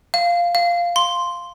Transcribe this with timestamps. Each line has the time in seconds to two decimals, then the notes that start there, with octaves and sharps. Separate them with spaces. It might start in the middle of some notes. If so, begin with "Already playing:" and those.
0.14 F5
0.55 F5
0.96 C6